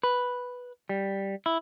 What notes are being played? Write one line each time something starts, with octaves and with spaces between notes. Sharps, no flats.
B4
G3
E4